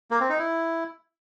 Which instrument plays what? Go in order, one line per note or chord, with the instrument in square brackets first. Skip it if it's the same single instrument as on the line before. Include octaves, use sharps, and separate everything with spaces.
[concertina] A#3
C4
D#4
E4